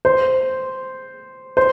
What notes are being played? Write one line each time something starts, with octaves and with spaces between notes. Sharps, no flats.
C5
C5